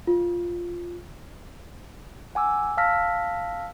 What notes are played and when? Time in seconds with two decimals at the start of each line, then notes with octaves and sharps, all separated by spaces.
0.07 F4
2.35 F#5 G#5 D6 E6
2.77 F5 A5 E6 F6 A#6 B6